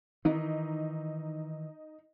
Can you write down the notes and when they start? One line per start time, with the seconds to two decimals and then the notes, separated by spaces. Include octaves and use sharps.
0.25 D#3 E3 D#4